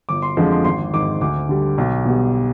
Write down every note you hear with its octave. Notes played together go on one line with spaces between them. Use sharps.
G1 D6
C6
F2 D3 F3 G#3 F5
C6
G#1 C6
G#2 D#3 D6
D2 D6
D3 G3
B1
B2 G3